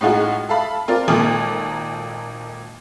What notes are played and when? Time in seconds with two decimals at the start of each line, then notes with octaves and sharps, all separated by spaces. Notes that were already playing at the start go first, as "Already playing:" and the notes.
0.01 A2 G#3 D#4 F4 F#4 G#4
0.49 A4 E5 F5 A5 B5
0.88 C4 F4 A#4 D5
1.08 G#1 A#2 D#3 A#3 A4